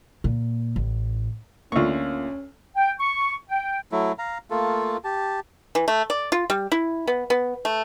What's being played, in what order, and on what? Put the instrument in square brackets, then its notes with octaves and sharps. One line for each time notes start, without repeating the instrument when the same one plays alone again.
[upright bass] A#2
A1
[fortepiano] D2 C#6 [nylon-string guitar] A#3 F4 [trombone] C#4
[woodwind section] G5
C#6
G5
[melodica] F#3 A3 E4
F5 A#5
A3 A#3 F4 A4
G4 A5
[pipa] E3
A3
D5
F4
G3
E4
B3
B3
A3